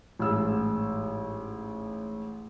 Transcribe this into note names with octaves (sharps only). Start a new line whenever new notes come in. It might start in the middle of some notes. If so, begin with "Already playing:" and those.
A1 G#2 G#4 E6